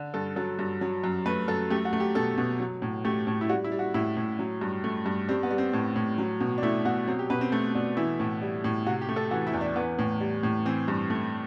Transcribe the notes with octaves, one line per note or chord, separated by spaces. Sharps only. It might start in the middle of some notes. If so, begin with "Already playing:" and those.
Already playing: D3
G2 A4
F#3 A4
G2
F#3
F#2
A3 B4
F#2 A4
A3 G4
F#4
A3
G4
B2 A4
B2
F#3
A2
A3 G4
A2
E4
G3 F#4
E4
G3
F#4
A2 E4
A2
F#3
G2
A3
G2
G3 C4
B3
G3
C4
A2
A2
F#3
B2
D4
A3 E4
B2 F#4
F#3 C4
G4
B2 B4
C4
A3 C4
B2 D4
E3 E4
A2
G3
A2
C3 F#4
G4
A3
A4
E3 F#4
E4
E2
D4
E3 B3
A2
G3
A2
E3 C4
G2
A3